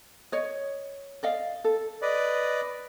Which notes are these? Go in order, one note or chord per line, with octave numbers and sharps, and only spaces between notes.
C#5 D#5
D5 D#5 F5
A4
B4 D5 D#5